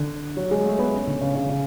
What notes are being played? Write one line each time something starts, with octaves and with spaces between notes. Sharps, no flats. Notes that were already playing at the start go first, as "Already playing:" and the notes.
Already playing: D3
F#3
G#3
A3
B3
C#4
D3
C#3
C#3
C#3